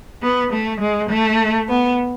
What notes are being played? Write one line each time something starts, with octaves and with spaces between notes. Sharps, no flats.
B3
A3
G#3
A3
B3